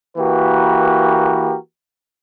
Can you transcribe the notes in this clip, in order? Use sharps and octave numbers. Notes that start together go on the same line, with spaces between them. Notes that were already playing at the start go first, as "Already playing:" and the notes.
E3 A#3 F#4 G4 A#4 B4